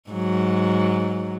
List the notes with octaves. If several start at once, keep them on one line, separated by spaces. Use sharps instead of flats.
G#2 F#3